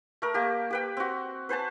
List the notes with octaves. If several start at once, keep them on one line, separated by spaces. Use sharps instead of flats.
A3 A#4
A#3 G4
G4 B4 G5
C4 F#4
B4 C5 G#5 A5